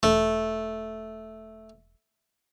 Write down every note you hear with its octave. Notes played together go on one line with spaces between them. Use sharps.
E1 A3